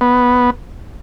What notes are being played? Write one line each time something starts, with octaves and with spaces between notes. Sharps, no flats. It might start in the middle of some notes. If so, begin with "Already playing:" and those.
B3